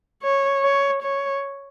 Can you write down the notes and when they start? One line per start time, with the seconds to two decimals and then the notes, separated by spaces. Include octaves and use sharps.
0.23 C#5
0.63 C#5
1.02 C#5